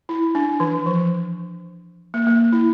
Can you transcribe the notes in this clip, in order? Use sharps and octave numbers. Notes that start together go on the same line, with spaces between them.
E4
D4
E3
F3
A#3
A#3
E4